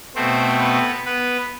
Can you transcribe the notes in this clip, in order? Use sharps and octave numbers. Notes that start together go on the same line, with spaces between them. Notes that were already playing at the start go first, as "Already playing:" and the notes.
B2 A3 C4 C5
B3 B4
B3 B4